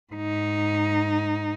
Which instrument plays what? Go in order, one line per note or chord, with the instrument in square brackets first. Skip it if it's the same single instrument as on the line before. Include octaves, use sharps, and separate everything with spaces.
[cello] G#2 D#4